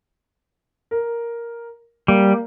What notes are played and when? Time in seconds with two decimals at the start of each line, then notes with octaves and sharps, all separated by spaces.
0.91 A#4
2.08 G3 A#3